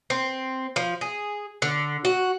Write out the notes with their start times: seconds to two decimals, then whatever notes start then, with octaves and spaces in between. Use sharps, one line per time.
0.10 C4
0.76 F3
1.01 G#4
1.62 D3
2.05 F#4